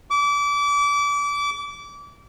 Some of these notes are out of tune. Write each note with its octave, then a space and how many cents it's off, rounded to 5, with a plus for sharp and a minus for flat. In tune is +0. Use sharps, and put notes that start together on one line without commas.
D6 -30